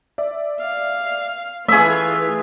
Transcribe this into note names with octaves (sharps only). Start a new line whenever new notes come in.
D5 E5
F5
E3 A3 F4 G#4 E5